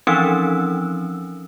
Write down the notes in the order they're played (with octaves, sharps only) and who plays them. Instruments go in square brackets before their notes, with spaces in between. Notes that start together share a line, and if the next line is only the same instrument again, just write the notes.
[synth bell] E3 F3 C4 C#4 D#4 E6